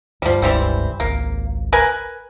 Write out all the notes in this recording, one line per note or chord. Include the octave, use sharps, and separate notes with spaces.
D2 G2 F3 G3
F1 C#2 G2 E3 G3 C4
G#1 C#2 A#3
A#4 B4 G#5